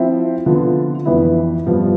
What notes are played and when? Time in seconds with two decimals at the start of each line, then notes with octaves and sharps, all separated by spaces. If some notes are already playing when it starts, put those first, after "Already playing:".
Already playing: F3 C4 E4
0.46 D3 F3 B3 F4
1.05 F2 E3 B3 E4
1.66 G2 F3 B3